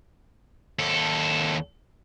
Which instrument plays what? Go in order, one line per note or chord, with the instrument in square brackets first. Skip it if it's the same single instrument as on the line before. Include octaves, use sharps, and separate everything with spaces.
[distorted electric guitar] D#2 A4